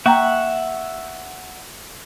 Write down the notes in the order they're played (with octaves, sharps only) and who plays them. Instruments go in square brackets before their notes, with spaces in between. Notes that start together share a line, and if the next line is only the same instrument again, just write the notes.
[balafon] A#3 G5 A#5 [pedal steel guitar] E5 F#5 C#6